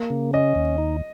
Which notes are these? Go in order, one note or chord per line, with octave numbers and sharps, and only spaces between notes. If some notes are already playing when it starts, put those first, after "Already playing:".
Already playing: A#3
C#3
C#4 D#5
D#2
D#4